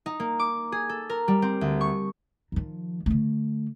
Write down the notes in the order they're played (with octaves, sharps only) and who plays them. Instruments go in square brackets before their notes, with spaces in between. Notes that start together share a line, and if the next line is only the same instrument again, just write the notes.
[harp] D#4
A#3
D6
G#4
A4
A#4
G3
C4
D2
C#6
[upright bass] D#3 F3
D3 A3